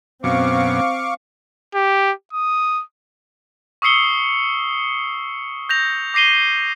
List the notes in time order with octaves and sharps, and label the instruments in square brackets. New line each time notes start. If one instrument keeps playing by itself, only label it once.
[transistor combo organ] F#2 B2 [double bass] C4 [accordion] F5 C#6 D6
[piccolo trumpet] G4
D#6
[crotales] C#6 D#6 E6 C7 C#7 G7
G6 A#6 F7
D6 A#6 C7 D#7 G7